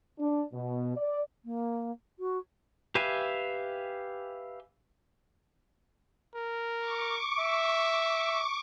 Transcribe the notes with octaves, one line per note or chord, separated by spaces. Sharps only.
D4
B2
D5
A#3
F#4
G4 B4 E5 F5 G#5
A#4
C#6 D6
E5